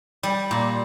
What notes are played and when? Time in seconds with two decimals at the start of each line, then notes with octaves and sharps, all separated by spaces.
0.23 G3
0.51 A#2